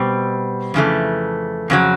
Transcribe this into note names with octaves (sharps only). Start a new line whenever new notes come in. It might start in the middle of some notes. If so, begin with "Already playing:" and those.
Already playing: B2 G3 C4
F2 C#3 E3 A3
F2 C#3 F#3